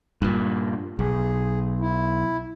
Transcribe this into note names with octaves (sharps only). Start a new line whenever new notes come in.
G2 A#2
B1 G#4
E4